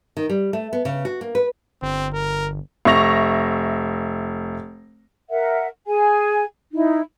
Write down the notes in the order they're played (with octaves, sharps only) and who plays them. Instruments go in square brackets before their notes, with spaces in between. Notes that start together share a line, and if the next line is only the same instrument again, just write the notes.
[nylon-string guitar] D#3
G3
A3
B3
C#3
F#4
A#3
B4
[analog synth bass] G1 [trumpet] C4
[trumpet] A#4
[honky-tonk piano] F1 E5 C#6 A#6 F7
[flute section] A#4 E5 F#5
G#4 G#5
D#4 E4